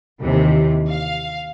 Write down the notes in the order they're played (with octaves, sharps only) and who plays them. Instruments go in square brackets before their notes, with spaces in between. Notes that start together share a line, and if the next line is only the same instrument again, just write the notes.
[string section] D#2 C3 E3
F5